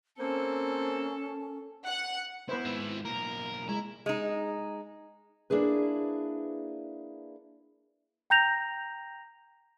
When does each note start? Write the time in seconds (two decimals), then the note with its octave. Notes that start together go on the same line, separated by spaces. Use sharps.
0.19 A#3 C4 C#4 A4
1.86 F#5
2.49 B3 E4 B4 C5
2.65 G#2 C4
3.05 B1 A#3 A#4
3.69 G#3 E4 A#5
4.06 G#3 D#4
5.50 A#3 D4 E4 G#4 B4
8.30 G5 A#5 G6 A#6 F7